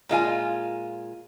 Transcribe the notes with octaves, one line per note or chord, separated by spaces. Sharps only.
A#2 G#3 F4 G#5